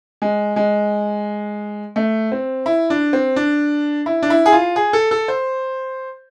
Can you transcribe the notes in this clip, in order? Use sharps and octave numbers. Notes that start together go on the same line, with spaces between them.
G#3
G#3
A3
C4
E4
D4
C4
D4
E4
D4
E4
G#4
F4
G#4
A4
A4
C5